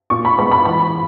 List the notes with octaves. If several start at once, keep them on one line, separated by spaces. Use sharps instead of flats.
A#2 C#6
B5
G#3 B3 B5
B5
E3 B5